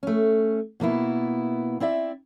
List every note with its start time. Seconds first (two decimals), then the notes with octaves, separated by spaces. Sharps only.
0.03 A3 C#4
0.80 B2 A#3 B3 E4
1.80 C4 E4 D5 E5